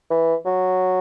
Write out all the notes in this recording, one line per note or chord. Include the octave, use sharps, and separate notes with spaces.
E3
F#3